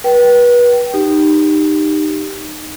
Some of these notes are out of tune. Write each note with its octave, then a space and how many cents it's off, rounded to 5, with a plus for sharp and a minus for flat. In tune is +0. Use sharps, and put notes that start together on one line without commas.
B4 -30 G5 -25
D#4 -15 G4 +0